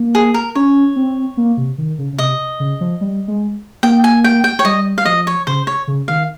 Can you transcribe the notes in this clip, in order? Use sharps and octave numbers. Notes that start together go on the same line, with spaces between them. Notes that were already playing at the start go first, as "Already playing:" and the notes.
Already playing: A#3
G#4
A#4
C#4 C#5
C4
A#3
C3
D#3
C#3
C#3
C3 D#5
C#3
F3
G3
G#3
A#3 G5
G#5
G5
G5
C#5
G3 D#5
F5
F3 D#5
C#5
C#3 C5
C#5
C#3
D#3 F5